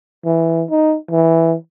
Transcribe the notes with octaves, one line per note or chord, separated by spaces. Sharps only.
E3
D#4
E3